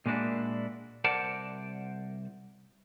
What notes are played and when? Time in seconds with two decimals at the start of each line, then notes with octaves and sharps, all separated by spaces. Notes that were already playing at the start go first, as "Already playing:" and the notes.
0.06 A#2 G#3 A#3 D4 E4 F#4
1.04 C2 A#4 C5 D5 F#5 A5